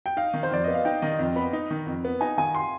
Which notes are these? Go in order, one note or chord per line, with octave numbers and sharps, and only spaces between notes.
G5
D#4 F5
D#3
C5
F2 D5
B3 D#5
F5
D#4 G5
D#3 D#5
F2
B3 B5
D#4
D#3
F2
B3
D#4 G#5
D#3 G#5
C6